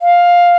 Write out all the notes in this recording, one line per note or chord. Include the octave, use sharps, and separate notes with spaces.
F5